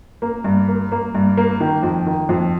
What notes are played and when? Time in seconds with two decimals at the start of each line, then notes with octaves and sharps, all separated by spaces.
0.22 A#3
0.44 G2
0.68 A#3
0.92 A#3
1.15 G2
1.37 A#3
1.60 D#3
1.83 F2
2.06 D#3
2.29 F2